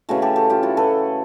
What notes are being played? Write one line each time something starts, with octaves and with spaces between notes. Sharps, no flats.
C#3 E3 A3 F#4 G#4
G4 A4
G4 A4
F4 G4
E4 F#4
A4 B4